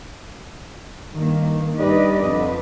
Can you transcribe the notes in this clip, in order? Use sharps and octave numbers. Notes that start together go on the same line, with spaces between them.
G2 D#3 A#3
G2 D#4 G4 B4 D5 D#5
F2 D3 D4 B4